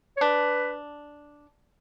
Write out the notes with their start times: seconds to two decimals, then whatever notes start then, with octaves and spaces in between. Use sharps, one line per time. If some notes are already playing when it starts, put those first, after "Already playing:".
0.17 C#5
0.21 D4 B4